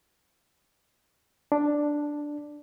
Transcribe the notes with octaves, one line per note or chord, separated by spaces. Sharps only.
D4